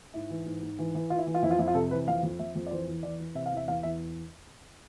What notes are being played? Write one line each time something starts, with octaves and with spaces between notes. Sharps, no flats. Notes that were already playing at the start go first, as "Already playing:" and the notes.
G#2 E4
E3
G#2
G#2
E3
E3
E3 F4
E4
E3
F4
F2 E4
F4
F2 E4
F4
C3 A4
E3 B4
F2 F5
F2
F2 E5
F2
D5
E3 C5
E2
E3 D5
E3
C3 E5
F5
E2 E5
E2 F5
E2 E5